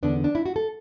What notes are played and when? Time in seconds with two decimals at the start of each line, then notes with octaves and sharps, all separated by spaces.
0.03 E2 D3 B3 D4
0.24 D4
0.35 E4
0.46 F#4
0.56 A4